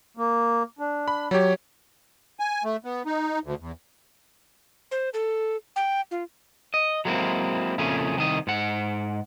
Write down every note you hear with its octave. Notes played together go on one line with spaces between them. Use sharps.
A#3
D4
B5
F#3 G4 C#5
G#5
A3
B3
D#4
D2
E2
C5
A4
G5
F4
D#5
F#3 G#3 A#3 C4 E4
F2 A#2 C#3 A3 C#4 G#4
C2 D#3 D#5
G#2 F#5